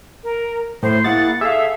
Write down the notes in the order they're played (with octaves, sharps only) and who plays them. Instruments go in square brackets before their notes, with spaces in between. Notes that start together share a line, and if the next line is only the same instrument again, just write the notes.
[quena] A#4
[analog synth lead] A2 [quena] C5
[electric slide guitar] A#3 E4 G#4 [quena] F#5 [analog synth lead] A6
[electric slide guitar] G#4 F5 [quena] A4 [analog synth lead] E5